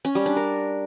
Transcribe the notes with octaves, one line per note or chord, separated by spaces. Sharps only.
C#4
G3
D4
A#4